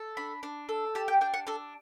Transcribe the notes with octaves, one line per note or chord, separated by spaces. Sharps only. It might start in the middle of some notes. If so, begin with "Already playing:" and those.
Already playing: A4
D4 B5
D4
A4
G4 A5
G5
D4 G5
F#5
D4 A4